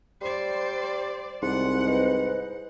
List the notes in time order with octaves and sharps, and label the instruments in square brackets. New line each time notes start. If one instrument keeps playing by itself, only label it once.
[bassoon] G3 [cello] C5 D5
[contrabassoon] C2 [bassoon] G#2 [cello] F#5 [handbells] C6
[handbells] B4 C5 D#5